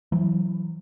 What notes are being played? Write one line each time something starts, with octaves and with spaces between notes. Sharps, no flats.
E3 F#3